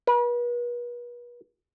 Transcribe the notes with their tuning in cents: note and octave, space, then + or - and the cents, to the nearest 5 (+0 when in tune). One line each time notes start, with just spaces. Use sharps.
B4 -40